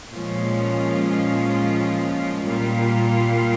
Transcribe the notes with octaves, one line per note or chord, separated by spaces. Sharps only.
A#2 F3 G#3 C#4 F4
A#2 G3 A#3 F4